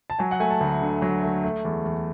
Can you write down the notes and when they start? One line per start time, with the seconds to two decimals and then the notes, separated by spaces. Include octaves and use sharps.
0.10 A5
0.19 F#3 G#5
0.31 F#5
0.40 A3 G#5
0.50 A5
0.61 D2
0.82 D3
1.02 F#3
1.23 A3
1.43 A3
1.65 E2
1.86 E2